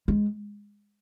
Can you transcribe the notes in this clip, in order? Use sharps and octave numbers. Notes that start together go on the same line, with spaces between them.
G#3